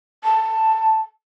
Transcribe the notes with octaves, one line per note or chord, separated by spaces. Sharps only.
A5